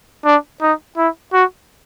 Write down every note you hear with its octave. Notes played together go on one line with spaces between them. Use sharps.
D4
D#4
E4
F#4